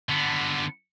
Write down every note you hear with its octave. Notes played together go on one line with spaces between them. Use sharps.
D3 B3